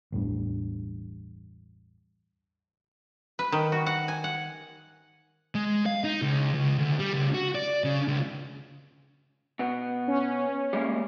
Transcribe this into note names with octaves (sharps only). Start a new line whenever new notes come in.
A1 E2 G2
B4
D#3
F#4
F#5
G#5
F#5
G#3
F5
D#4
C#2
C#2
D2
G3
C#2
F#4
D5
C#3
C#2
B2 B3
C#4
G3 G#3 A#3